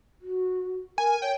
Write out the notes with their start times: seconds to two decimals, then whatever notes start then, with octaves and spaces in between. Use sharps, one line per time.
0.21 F#4
0.98 A#4 G#5
1.22 C#5 G5